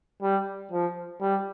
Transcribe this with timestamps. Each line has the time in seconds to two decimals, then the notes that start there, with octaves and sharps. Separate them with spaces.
0.22 G3
0.72 F3
1.21 G3